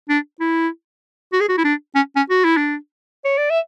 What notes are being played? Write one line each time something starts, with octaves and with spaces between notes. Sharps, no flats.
D4
E4
F#4
G#4
F#4
E4
D4
C#4
C#4
F#4
E4
D4
C#5
D5
E5